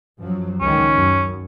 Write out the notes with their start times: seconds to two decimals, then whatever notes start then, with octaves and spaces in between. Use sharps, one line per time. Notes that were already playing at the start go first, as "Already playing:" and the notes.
0.21 F#2 F3 F#3
0.61 C#2 D#3 C#4
0.94 F#2